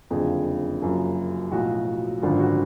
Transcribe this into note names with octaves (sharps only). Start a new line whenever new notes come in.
F#1 F2 D3 F3 G#4
F#1 F#2 F3
B1 A2 F3 F#4
G#1 F#2 D3 F3 F4
F#4